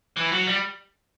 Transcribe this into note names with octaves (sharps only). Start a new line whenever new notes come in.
E3
F#3
G3